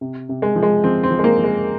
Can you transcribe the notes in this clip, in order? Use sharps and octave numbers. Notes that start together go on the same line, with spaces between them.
C3
C3
G#3
F3
G#3
F3 C4
C4
F3
G#3
A#3
F3
G#3